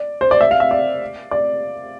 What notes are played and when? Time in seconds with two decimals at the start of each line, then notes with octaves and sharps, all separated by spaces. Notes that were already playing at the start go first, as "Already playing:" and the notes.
Already playing: D5
0.21 C5
0.31 D5
0.41 E5
0.51 F5
0.60 E5
0.71 D5
1.31 D5